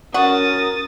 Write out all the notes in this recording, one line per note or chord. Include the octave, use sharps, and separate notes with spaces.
C#4 F#4 A#4 D#6 A6